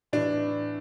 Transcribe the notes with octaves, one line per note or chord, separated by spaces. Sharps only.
A2 E3 D4